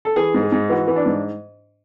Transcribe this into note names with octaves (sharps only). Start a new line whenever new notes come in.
A4
E3 G#4
G#2
G#4
G#2
E3 F#4
E3
D4
G#2